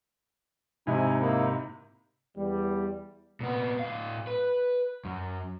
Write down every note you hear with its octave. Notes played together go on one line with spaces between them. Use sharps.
G#2 C3 D#4 E4 G#5
A#3 D#4 E4
E2 G3
A#2 B3
A2 F5
B4
F#2